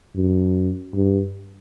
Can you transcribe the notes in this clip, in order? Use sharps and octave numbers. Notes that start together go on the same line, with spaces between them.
F#2
G2